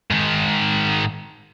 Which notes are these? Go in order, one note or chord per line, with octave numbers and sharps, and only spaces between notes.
G#2 D#3